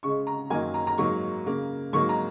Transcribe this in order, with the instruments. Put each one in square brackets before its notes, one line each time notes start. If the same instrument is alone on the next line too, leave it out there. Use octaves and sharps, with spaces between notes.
[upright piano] C#3 G#3 C#6
A#5
F#2 D#3 F#3 A#3 G#5
A#5
A#5
G#2 F#3 A#3 C#6
C#3 A#3
G#2 F#3 A#3 C#6
A#5